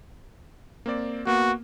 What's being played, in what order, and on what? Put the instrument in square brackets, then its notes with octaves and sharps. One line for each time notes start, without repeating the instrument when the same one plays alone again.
[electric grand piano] A#3 C4 D5
[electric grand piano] A#3 B3 [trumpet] F#4